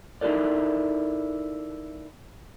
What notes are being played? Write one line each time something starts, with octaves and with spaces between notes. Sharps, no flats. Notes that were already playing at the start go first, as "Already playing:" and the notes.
D#4 E4 F#4 A4 A#4 D5